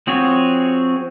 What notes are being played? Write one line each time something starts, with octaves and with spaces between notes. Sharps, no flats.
F3 C4 F#4 G#4 C#5